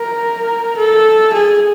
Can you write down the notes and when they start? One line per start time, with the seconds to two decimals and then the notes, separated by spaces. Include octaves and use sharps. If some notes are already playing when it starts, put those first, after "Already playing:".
Already playing: A#4
0.77 A4
1.33 G#4